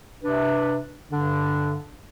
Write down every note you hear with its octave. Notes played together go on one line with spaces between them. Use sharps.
C3 D4 B4
G2 D3 D4